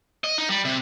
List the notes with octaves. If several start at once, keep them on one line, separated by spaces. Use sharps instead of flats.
D#5
D#4
G3
C3